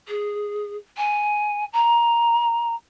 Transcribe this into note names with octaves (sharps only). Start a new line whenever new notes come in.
G#4
G#5
A#5